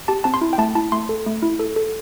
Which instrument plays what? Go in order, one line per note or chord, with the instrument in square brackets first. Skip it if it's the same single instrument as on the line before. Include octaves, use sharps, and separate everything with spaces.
[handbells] G4 A5
C4 A5
C6
E4
G5
A3 A5
E4 A5
A3 C6
A4
A3
E4
A4
A4